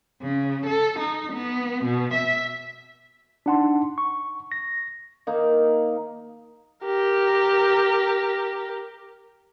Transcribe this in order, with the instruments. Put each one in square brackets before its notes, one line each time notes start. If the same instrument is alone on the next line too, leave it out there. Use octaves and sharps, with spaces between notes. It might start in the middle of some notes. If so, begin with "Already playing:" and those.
[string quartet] C#3
A4
D#4
B3
B2
E5
[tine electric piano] D4 D#4 F#5 A5 C6
C#6
A#6
[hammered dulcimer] D#3 A#3 D#4
[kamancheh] G4 A#4